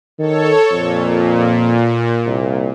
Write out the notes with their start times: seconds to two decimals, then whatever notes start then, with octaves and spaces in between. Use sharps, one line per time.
0.19 D#3 A4 C#5
0.71 F2 A#2
2.26 C2